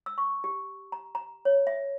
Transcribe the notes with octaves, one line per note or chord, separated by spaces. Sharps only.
E6
C#6
G4
A#5
A#5
C#5
E5